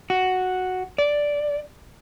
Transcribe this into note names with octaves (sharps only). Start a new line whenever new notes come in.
F#4
D5